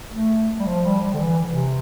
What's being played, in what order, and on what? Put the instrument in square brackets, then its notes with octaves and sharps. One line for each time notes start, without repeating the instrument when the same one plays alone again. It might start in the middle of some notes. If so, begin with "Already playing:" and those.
[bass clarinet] A3
G3
F3
G3
G3
D3
E3
C3